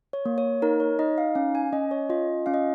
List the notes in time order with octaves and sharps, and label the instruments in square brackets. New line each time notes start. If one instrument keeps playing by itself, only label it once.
[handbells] C#5
A#3
C#5
D#4 A#4
C#5
D#4 D#5
F5
C#4 F5
G#5
C#4 D#5
C#5
F4 D#5
C#4 F5
D#5